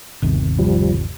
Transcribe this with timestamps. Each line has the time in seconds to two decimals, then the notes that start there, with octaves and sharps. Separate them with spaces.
0.22 G1 D#2 C3
0.59 F3 G3